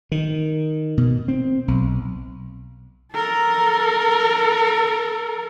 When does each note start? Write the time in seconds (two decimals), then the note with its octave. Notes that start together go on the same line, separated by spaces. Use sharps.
0.12 D#3
0.98 B2
1.28 C4
1.68 B1
3.13 A4 A#4